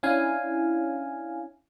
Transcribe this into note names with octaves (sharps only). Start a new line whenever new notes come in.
C#4 D4 E4 F5 G#5